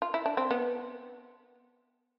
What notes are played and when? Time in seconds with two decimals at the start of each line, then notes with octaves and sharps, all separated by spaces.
0.02 F4
0.14 E4
0.26 D4
0.37 C4
0.51 B3